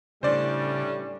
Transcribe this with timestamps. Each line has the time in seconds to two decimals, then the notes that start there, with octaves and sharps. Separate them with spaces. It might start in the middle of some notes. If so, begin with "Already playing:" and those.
0.23 A2 C#3 G3 C#4 D4 C5 D5